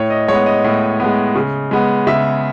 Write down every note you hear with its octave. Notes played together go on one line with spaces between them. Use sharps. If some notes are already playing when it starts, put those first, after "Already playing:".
Already playing: A2 C#5
D#5
G#3 B3 C#5
D#5
A2
G#3 B3
C#3
G#3 B3
C#3 E5